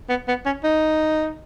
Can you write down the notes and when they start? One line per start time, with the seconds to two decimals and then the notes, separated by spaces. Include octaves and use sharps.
0.09 B3
0.28 B3
0.45 C#4
0.64 D#4